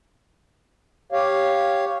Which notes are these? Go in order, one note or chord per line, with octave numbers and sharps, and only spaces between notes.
G4 C#5 F5